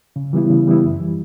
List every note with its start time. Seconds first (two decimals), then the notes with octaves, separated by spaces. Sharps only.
0.16 C#3
0.33 E3 G3 B3 E4
0.50 C#3
0.67 E3 G3 B3 E4
0.83 F#2
1.00 E3 G3